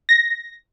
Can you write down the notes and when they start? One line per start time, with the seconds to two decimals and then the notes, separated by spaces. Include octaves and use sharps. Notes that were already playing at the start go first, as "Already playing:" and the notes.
0.09 A#6